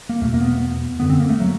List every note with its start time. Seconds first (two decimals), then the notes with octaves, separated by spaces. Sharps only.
0.09 A#3
0.21 E2 A3
0.24 B2
0.34 A#3
0.41 B3
1.00 F#2 D3 B3
1.10 C4
1.20 A#3
1.29 A3
1.40 F#3